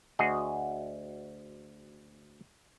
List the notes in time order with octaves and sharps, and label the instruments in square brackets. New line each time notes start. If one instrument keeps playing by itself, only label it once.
[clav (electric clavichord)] D2 F#4 G#4 D#5